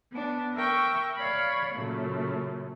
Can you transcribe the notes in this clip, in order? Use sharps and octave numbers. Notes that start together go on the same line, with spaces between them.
B3 D4
A#4 E5 G5 C#6
C#5 D5 F5 B5
F#2 A#2 C#3 A3